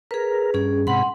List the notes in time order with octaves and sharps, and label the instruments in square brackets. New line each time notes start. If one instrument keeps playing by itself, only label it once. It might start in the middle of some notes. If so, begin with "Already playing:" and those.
[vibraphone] G#4 B4 [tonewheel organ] A#4
[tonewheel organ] G2 [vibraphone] C#4 G#4
[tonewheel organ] G#2 C3 B5 [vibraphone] F#5 C6